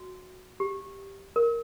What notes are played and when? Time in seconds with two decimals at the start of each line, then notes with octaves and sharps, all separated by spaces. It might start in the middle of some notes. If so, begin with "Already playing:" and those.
Already playing: F#4
0.60 G4
1.36 A#4